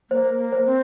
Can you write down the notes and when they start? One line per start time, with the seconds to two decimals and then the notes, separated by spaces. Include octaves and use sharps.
0.10 A#3 C5
0.38 A#3
0.52 C5
0.66 C4